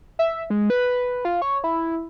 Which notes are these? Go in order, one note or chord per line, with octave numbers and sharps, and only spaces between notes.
E5
G#3
B4
F4
C#5
E4